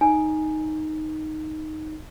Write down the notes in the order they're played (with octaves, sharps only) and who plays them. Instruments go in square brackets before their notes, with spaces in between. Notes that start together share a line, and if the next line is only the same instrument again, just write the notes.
[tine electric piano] D#4 [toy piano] G#5